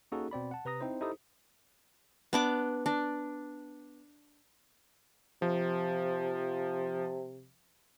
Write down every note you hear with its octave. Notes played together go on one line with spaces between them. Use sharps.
A#3 C#4 D#4 F#4 G#4 A4
B2 C4 D5 B5
F#5 A5
C3 B4 A#5 D#6 A#6
C4 D#4 E4 C5
D#4 E4 G4 A4 C5 D#6
B3 D4 D6
D4
C3 F3